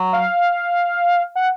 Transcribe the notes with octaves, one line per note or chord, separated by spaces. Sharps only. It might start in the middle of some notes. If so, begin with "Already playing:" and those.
Already playing: F#3
F5
F#5